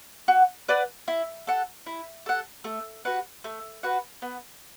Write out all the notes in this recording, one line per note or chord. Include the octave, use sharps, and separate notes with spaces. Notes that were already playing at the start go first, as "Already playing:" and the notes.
F#4
B4 D5 F#5
E4
A4 F#5
E4
A4 F#5
A3
F#4 B4 F#5
A3
F#4 B4 F#5
B3